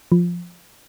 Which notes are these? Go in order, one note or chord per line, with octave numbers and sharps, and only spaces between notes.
F3